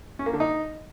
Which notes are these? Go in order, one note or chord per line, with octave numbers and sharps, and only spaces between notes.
C#4
A#3
D3
D#4